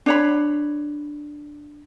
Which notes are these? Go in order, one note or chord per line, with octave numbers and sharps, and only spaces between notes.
D4 C#5 B5